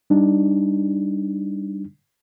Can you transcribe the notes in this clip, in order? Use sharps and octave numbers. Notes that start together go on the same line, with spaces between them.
G3 D4 D#4